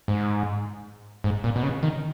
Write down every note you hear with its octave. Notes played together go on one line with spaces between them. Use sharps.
G#2
G#2
A#2
B2
C#3
D#3